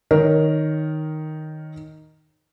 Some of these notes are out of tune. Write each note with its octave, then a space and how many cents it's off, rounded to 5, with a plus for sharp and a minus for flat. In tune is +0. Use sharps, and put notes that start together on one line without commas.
D#3 +0 A#4 +0 C#5 +0